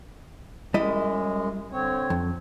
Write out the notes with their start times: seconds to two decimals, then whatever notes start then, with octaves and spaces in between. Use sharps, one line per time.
0.74 F#2 G3 G#3 E4 D#5
1.72 D3 C4 C#5
2.10 F2